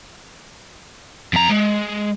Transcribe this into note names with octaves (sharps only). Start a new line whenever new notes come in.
F2 A#5
G#3